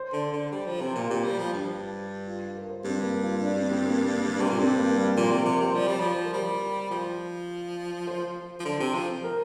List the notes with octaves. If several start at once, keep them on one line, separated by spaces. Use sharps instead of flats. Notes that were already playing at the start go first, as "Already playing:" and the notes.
Already playing: C5
D3
D3
G3
F3
C3
A#2 F4
A#2 G4
G3
F3
G2
F4
A#4
C5
G2 C4
G3
A#3
F4
D4
C4
C4
A#3
A#3
G3
C3 G3
A#2
G2 C4
A#3
G3
A#2 F3
C3 G3
C3 A#4
C3 C5
F3 D5
G3
F3 C5
A#4
G3 C5
F3 C5
C5
F3
D3
C3
F3
A#4